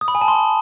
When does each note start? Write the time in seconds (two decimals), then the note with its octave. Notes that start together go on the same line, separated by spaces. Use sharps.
0.01 D#6
0.08 B5
0.15 G#5
0.21 A5
0.28 C6